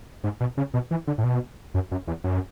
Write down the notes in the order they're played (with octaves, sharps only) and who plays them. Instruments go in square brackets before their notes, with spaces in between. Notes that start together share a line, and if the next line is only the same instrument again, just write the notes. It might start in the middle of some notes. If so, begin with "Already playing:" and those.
[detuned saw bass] G#2
B2
C#3
B2
E3
D3
A2
B2
F#2
F#2
E2
F#2